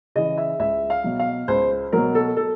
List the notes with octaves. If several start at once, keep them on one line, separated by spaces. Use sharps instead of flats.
C#3 E3 D#5
E5
C#2 E5
F5
B2 F#3
F5
C#2 C5
B2 F#3 A#4
A4
A4